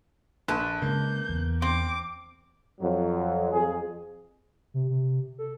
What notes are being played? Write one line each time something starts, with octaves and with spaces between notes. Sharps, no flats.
A#1 B4 A5
C#3 G#3 A#3 G6
E2
C4 D6
F2 F#3
F2 G#4
C3
C3
A4